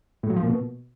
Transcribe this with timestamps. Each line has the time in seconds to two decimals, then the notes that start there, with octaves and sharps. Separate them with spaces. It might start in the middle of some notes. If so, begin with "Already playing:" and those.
0.23 A2
0.30 F#3
0.36 F3
0.43 A#2
0.50 B2